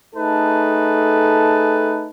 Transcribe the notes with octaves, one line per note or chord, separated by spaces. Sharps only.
A3 D#4 G#4 A4 B4 A5